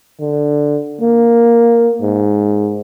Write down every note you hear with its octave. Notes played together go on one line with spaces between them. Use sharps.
D3
A#3
G#2